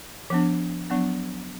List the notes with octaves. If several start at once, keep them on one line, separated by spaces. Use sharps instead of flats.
F3 B3 D4
F#3 B3 D4